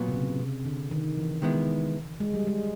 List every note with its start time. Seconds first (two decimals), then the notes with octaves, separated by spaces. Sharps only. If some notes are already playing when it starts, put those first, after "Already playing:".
Already playing: A#2 F#3 B3
0.08 C3
0.14 C#3
0.39 C3
0.65 D3
0.91 D#3
1.17 E3
1.42 D#3 G#3 B3 E4
2.20 G#3
2.34 G3
2.47 G#3